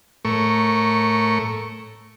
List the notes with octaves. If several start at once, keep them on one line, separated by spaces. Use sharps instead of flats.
A2 A3 A#4 C#6